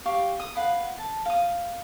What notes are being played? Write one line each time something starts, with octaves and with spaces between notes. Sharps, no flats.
G4 F5 G5 C#6
D#6
B4 F5 F#5
A5
F5 D#6